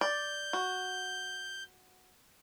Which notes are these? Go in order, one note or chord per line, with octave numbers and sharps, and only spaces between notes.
D5 G6
F#4